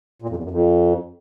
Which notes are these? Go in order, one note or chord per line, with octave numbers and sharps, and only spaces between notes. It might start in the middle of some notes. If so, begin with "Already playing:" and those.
A#2
F2
E2
F#2
F2